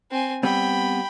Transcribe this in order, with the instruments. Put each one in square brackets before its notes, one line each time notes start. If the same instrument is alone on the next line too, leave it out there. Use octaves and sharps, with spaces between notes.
[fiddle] C4 G#5
[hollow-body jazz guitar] G3 B3 C4 [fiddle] G5 B5